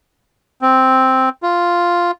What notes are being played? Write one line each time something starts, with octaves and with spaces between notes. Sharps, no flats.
C4
F4